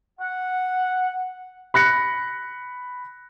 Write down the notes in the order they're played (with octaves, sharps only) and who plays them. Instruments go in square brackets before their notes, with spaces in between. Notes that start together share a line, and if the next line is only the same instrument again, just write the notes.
[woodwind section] F#5
[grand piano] B5 F#6 A#6 C#7